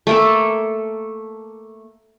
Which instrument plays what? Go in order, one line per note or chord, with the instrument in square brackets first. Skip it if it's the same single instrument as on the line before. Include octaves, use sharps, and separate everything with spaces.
[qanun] A3 A#3 A4